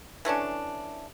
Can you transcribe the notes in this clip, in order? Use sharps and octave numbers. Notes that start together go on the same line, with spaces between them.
E3 A3 C#4 D4